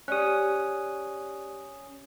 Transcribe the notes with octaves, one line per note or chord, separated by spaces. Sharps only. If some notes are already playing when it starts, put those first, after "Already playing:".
C#4 G4 D5 D#6 F#6